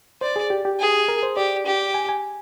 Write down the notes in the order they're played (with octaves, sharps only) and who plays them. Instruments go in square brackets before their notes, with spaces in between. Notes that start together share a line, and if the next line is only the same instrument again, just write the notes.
[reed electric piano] C5 [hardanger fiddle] D5
[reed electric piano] G#4
G4
G4
[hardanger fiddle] G#4
[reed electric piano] A#4
C5
[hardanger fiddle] G4 [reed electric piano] D5
[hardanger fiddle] G4
[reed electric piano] G#5
G#5